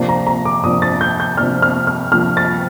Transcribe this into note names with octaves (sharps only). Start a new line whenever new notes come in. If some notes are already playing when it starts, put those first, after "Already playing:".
Already playing: C3 F3 A#3 D4
A#5
A#5
D6
C3 F3 A#3 D4 D#6
A6
G6
G6
C3 F3 A#3 D4 F6
F6
F6
C3 F3 A#3 D4 F6
A6